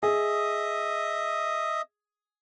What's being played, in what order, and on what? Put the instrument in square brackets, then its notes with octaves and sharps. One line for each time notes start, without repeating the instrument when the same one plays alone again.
[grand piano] G#4 [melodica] D#5 E5 D#6